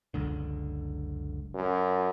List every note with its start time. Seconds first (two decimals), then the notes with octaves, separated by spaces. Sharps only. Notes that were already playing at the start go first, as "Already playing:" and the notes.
0.14 F#1 C#2 D3
1.54 F#2